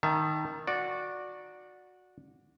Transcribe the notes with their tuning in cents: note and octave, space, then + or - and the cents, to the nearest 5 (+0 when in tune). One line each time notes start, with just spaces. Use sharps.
D#3 +0 E5 +35 A5 -5
F#4 -15 D5 +0